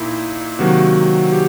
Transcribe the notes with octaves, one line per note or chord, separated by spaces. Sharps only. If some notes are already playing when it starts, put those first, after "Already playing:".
Already playing: A#2 A#3 D#4 E4
C3 D#3 F#3 A#3 F#4
G4